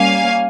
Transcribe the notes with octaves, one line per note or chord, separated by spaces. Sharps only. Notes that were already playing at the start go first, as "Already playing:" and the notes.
Already playing: G3 A#3 C#4 F5 G#5